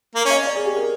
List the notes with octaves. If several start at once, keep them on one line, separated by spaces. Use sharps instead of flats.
A#3
C#4
D#5
D5
G#4
G4
A#4